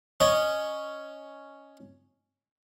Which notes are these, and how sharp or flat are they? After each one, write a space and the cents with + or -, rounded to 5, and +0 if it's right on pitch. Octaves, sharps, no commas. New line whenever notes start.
C#4 +0 D#5 -10